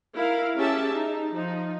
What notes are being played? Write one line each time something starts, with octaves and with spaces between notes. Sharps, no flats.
E4 A#4 F5
C#4 G4 G#4 E5 A5
D#4
F3 D#4